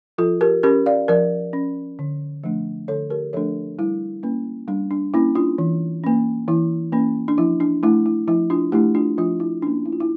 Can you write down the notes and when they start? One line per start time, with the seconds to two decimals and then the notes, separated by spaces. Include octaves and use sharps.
0.18 F3 F4 A4
0.41 G4 A#4
0.63 C#4 G4 A#4
0.86 D5 F5
1.08 F3 A#4 D5
1.53 C#4
1.99 D3
2.44 F3 A3 D4
2.88 D3 A4 C#5
3.10 G4 A#4
3.33 F3 A3 D4 A4 C#5
3.79 G3 E4
4.23 A#3 C#4
4.68 G3 D4
4.91 D4
5.14 A#3 C#4 E4
5.35 D4 F4
5.58 E3
6.04 A#3 C#4
6.48 E3 E4
6.92 A#3 C#4
7.28 D4
7.38 F3 E4
7.60 D4
7.83 A3 D4 E4
8.06 E4
8.28 F3 E4
8.50 D4 F4
8.72 A3 D4 E4 G4
8.95 D4 F4
9.18 F3 D4 F4
9.40 E4
9.62 A#3 C#4 D4
9.86 E4
9.92 F4
10.00 E4